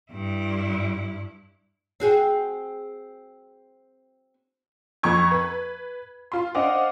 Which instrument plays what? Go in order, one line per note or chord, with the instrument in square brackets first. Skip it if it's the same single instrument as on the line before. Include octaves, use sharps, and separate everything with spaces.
[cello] G2 E4
[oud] C4 F#4 G#4
[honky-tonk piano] F2 F3 A#5 C#6 G#6
B4
F4 C6
D4 C5 D#5 F5 F#5 D6